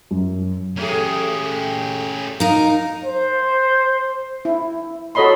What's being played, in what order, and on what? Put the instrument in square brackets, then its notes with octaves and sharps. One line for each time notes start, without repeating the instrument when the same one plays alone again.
[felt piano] F#2
[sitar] A3 G#4 [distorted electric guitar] C#4 G4
[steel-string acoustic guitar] D#4 A#4 [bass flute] F5
[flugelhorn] C5
[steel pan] E4
F#4 A4 C#5 D#5 B5 C6